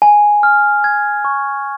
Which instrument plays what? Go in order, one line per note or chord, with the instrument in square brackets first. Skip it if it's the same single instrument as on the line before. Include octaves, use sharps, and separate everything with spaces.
[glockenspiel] G#5
F6
G#6
C#6